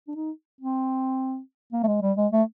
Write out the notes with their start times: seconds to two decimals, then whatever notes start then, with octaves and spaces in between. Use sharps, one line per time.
0.08 D4
0.15 D#4
0.61 C4
1.73 A#3
1.84 A3
1.87 G#3
2.02 G3
2.17 G#3
2.32 A3